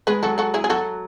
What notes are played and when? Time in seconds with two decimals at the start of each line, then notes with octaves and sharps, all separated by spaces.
0.07 G#3 G#4 B4
0.23 F#3 F#4 A4
0.38 F#4 A4
0.54 E4 G#4
0.64 G#4
0.70 F#3 F#4 A4